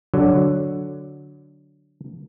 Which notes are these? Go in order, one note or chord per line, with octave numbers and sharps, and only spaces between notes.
D3 F#3